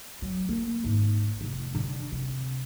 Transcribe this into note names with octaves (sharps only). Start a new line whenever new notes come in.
F#3
A#3
G#1
F1
D3
C3